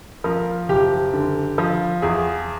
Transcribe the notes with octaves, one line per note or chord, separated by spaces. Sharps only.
F3 A#4
F#1 G4
D3
F3
E2 G#4